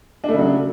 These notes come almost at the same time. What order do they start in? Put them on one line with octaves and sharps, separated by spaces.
D4 A3 C#3 F#3